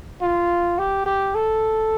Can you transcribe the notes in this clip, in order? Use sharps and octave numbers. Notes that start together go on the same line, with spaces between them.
F4
G4
G4
A4